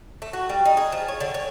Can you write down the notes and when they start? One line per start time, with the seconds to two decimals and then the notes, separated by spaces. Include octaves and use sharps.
0.22 A3
0.33 F#4
0.49 G3
0.65 D#4
0.77 G#4
0.92 F3
1.08 C#5
1.20 D3
1.34 C#5